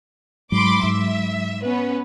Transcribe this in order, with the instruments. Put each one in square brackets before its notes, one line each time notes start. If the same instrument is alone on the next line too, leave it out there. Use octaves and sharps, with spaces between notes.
[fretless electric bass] G#2 [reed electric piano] F#3 [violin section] B5 C6 D6
[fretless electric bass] G#2 [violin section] E5
[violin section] B3 C#4 B4